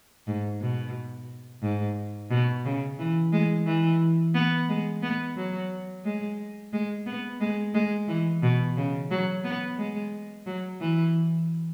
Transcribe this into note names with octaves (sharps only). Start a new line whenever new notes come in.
G#2
B2
G#2
B2
C#3
E3
G#3
E3
B3
G#3
B3
F#3
G#3
G#3
B3
G#3
G#3
E3
B2
C#3
F#3
B3
G#3
F#3
E3